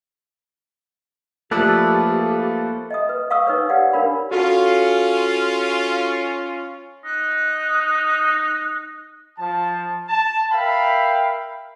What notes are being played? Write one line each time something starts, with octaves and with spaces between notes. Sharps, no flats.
F3 A3 A#3 G4 A4 B4 D5
D#5 E5 D#6
B4
F5 C#6 D#6 E6
D#4 B4 C#5
G4 D5 F5 F#5
D4 A#4 C#5 F5 B5
C#4 F4 F#4 A4
D#4 F#6
F3 A5
A5
A#4 E5 F5 G5 B5